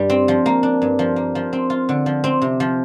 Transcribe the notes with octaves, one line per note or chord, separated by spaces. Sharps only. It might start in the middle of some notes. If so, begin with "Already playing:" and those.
Already playing: G2 G3
C4
F3
A#3
D4
G2
F3
A#3
F3
C4
F4
D3
F3
C4
C3
F3